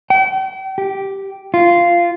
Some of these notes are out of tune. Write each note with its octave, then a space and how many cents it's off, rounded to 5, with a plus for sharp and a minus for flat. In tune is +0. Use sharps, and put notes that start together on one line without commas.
G5 -40
G4 -5
F4 -10